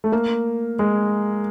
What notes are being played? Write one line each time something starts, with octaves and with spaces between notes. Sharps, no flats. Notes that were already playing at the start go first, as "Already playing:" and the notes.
A3
A#3
G#3